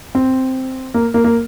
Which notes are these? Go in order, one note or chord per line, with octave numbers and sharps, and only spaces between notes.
C4
A#3
A#3
A#3